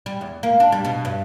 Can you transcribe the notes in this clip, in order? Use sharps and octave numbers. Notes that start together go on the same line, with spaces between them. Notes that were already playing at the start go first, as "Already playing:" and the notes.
G3
E2
A#3
D4
G3
B2
G2